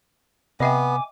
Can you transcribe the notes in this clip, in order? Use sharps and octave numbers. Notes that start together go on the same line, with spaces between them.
C3 B3 D#5 E5 G5 G#5 D6